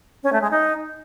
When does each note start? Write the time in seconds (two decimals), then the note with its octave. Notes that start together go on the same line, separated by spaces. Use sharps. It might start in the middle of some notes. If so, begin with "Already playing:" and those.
0.23 C#4
0.32 A3
0.42 G#3
0.51 D#4